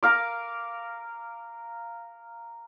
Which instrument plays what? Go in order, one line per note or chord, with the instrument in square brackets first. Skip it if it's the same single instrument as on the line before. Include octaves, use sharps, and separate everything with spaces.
[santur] A#4 F5 D6